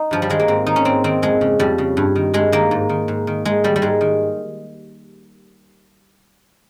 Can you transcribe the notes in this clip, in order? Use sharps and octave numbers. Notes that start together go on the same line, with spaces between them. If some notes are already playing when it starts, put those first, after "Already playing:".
Already playing: D#4
G2 F3
G3
D#3 G#3
A#3
G#2 C4
D#3 D#4
C#4
G#2 C4
D#3 C4
F2 G#3
C#3
F2 G3
C#3
G2
D#3
G2 G#3
D#3 A#3
G#2
D#3
G#2
D#3
G#2 G#3
D#3 G3
G3
G#2 G#3
D#3